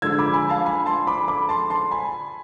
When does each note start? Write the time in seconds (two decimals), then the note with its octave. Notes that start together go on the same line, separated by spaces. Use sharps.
0.02 D3 F3 G#3 D4 E6 G#6
0.18 B5 D6
0.33 G#5 B5
0.49 F5 A5
0.66 G#5 B5
0.86 A5 C6
1.07 B5 D6
1.28 B5 D6
1.49 A5 C6
1.70 A5 C6
1.91 G#5 B5